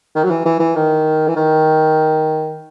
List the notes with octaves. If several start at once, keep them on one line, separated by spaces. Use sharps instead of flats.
D#3
F#3
E3
E3
E3
D#3
E3
D#3